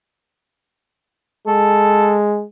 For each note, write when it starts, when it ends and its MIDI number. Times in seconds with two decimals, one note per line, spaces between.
1.47 2.44 56
1.47 2.15 69